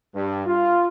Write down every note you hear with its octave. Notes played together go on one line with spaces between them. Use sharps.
G2
F4